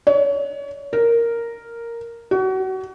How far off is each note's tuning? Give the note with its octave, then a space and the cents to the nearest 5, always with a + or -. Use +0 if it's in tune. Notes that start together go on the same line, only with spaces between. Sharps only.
C#5 +30
A#4 -5
F#4 +30